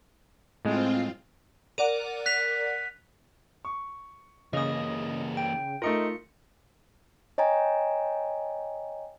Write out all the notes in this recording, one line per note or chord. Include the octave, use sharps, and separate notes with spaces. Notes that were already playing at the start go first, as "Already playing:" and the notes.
A2 G#3 C4 F4
A#4 D5 F#5 D#7
F#6 B6 F7
C#6
C#3 E3 A#3 D#5 D#6
G5
A3 D#4 F4 A#4 C#7
C#5 D#5 G5 G#5 A#5